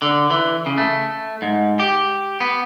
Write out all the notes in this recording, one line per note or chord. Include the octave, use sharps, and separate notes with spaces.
D3
E3
C#3
A3
G#2
G4
B3